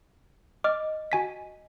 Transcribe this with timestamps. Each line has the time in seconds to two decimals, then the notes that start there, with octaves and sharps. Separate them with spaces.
0.64 D#5 D6 F6
1.12 F#4 G#5 B6